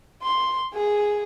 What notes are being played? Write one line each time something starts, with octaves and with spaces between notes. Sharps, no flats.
C6
G#4